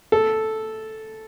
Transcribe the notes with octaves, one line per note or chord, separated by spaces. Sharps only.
A4